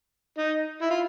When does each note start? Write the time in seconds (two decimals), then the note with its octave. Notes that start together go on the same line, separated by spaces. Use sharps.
0.38 D#4
0.82 E4
0.91 F4